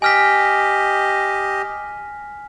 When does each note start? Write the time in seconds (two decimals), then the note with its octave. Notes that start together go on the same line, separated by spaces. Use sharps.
0.02 G4 D#5 G#5 F6 B6